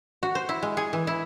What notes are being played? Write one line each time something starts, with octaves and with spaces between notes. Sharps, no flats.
F#4
C5
E4
G#3
G#4
E3
E4